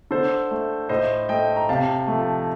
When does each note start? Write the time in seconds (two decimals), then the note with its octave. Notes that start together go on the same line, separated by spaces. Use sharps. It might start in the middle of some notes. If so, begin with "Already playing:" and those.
0.11 D3 A4 C5
0.51 A3
0.89 A2 C5 D#5
1.29 A3 D#5 G5
1.56 A#5
1.69 C3 F5 A5
2.08 F3 A3